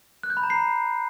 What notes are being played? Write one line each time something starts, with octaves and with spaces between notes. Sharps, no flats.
F#6
G6
B5
A#5
C7